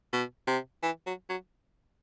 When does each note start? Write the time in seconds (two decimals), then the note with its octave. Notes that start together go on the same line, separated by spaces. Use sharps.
0.13 B2
0.47 C3
0.83 E3
1.06 F#3
1.29 F#3